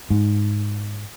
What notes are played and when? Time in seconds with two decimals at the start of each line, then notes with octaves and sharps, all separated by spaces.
0.10 G#2